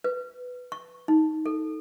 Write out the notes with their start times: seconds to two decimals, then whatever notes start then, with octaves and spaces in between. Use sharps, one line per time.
0.04 B4
0.72 C#6
1.08 D#4
1.46 A4